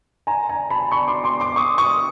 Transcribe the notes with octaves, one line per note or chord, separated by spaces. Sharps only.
G#5 A#5
G#5 A#5
A5 B5
B5 C#6
C6 D6
C6 D6
C6 D6
C#6 D#6
C#6 D#6